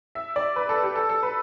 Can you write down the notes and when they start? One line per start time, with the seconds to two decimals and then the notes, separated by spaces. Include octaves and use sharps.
0.15 E5
0.36 D5
0.56 B4
0.69 A4
0.83 G4
0.96 A4
1.09 A4
1.23 B4